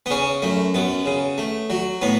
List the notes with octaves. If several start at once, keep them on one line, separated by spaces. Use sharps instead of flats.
B3
C#3 C#4
F#2 A3
F#2 B3
C#3
A3
F#3
A2 B3